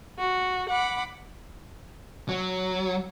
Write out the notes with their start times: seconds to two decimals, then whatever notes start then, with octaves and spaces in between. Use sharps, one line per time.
0.18 F#4
0.70 F#5 B5 D6
2.29 F#3